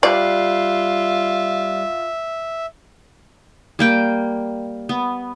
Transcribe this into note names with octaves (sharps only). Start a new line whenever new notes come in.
G3 F4 D5 E5 F#6 C7
G3 A#3 G5
B3